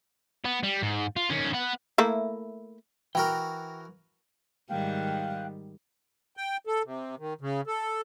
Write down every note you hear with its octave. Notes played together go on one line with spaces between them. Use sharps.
B3
G3
G#2
F4
D#3 C#4
B3 F#5
A3 A#3 E4
E3 F#4 A#4 G5
G#2 D#3 G3 F5 G5 F#6
G5
A4
C3
D#3
C#3
A4